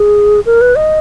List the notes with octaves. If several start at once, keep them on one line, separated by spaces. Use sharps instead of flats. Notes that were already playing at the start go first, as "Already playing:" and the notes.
Already playing: G#4
A#4
B4
D#5